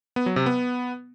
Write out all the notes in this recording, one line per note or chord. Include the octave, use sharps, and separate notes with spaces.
B3
F#3
C3
B3